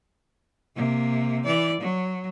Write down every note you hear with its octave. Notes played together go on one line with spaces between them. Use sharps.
C3 A#3
E3 D5
F#3